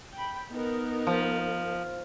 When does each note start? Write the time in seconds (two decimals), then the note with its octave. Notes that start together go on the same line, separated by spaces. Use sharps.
0.14 G5 B5
0.51 B3 D#4 A#4
1.07 F3